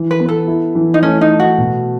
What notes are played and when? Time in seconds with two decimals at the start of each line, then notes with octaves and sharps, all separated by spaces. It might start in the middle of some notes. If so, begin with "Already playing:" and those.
Already playing: E3
0.11 B4
0.20 B3
0.29 A4
0.48 E4
0.75 E3
0.94 D#4
1.02 A3 C#4
1.21 D#4
1.31 A3
1.40 F#4
1.58 B2